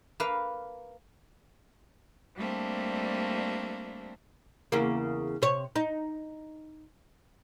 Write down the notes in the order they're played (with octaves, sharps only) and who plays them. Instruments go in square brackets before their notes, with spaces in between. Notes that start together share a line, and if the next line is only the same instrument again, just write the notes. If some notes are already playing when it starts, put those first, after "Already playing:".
[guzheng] A#3 B4 F5
[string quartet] G3 A3 A#3 C4 D4
[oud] E2 C#3 A#3
C3 C#5
D#4